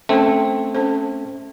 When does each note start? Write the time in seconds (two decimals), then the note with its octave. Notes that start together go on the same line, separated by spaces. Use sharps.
0.09 A3 C4 C#4 A4 C5
0.75 C#4 A4 C5